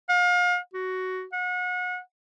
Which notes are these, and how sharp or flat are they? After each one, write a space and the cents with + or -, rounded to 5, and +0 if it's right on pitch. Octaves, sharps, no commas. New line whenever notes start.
F5 +35
F#4 +10
F#5 -35